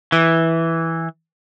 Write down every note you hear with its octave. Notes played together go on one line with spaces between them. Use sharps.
E3